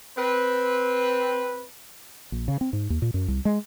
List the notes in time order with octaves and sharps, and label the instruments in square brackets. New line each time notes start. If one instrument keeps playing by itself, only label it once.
[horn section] C4 B4
[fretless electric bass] A#1
C#3
C4
G#2
D#2
A#2
F#2
C2
G#3